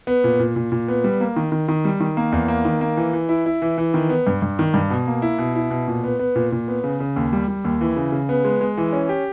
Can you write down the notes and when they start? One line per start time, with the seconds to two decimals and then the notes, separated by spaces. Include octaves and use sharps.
0.07 B3
0.24 A#2
0.39 A#2
0.56 A#2
0.72 A#2
0.88 B3
1.04 G3
1.21 A#3
1.36 D#3
1.52 D#3
1.68 D#3
1.85 G3
2.00 D#3
2.17 A#3
2.32 E2
2.48 A#3
2.65 D#3
2.81 A#3
2.97 E3
3.13 E3
3.29 E4
3.46 E4
3.62 E3
3.78 E3
3.94 D#3
4.09 B3
4.27 G2
4.42 G2
4.59 D#3
4.74 G2
4.90 B2
5.07 A#3
5.22 E4
5.38 B2
5.55 E4
5.70 B2
5.88 A#2
6.04 B3
6.19 B3
6.36 A#2
6.52 A#2
6.68 B3
6.84 C#3
7.00 C#3
7.16 D#2
7.33 G3
7.48 G3
7.64 D#2
7.81 E3
7.96 C#3
8.12 C#3
8.29 B3
8.44 G#3
8.61 G#3
8.78 E3
8.93 C#4
9.09 G4